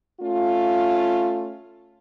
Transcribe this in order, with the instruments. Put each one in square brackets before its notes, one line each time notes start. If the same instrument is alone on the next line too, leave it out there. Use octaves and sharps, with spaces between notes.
[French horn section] A3 C#4 F4